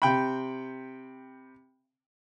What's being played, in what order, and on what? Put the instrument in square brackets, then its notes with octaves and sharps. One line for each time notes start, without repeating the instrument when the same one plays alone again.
[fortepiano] C3 G5 B5